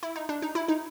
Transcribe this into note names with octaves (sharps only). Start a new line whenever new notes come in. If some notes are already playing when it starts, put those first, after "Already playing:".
E4
D#4
D4
D#4
E4
D#4